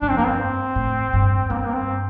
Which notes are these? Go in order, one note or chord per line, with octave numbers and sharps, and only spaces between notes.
G2 D4
F2 C4
G2 A#3
C4
A2
G2
G2 A#3
C4
A#3
C4